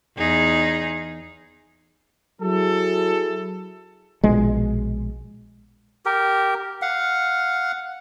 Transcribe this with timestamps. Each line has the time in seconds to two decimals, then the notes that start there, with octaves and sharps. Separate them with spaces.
0.17 E2 D#4 G#4
2.41 F#3 E4 G#4 A4
4.24 A#1 B2 G#3
6.06 G4 A#4
6.82 F5 F#5